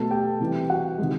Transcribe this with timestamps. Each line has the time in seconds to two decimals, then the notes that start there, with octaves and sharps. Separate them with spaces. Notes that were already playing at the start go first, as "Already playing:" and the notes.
Already playing: B2 F#3 A3 A4 A5
0.11 G4 G5
0.40 C3 E3 G3
0.69 F#4 F#5
0.98 C3 D#3 G#3